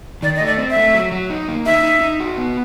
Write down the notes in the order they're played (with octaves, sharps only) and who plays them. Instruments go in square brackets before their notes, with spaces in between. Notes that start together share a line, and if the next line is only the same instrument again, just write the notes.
[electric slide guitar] D#3 [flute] D5
[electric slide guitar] A3 [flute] D#5
[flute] D5
[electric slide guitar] C4
[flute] E5
[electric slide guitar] A3
F#3
F#3
D#4
A#3
[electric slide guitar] D#4 [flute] E5
[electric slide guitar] D#4
D#4
F#4
B3